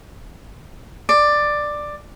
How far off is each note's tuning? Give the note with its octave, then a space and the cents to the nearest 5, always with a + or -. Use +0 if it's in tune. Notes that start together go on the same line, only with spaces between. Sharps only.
D5 +10